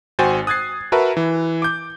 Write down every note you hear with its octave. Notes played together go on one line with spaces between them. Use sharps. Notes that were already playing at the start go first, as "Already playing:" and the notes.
G#1 F#4 C5 G5 G#5 A6
D#6 F#6 G#6 A6 C7
F#4 A#4 B4 E5 A5
E3
D6 G6